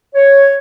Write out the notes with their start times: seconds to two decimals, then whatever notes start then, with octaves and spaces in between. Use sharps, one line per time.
0.15 C#5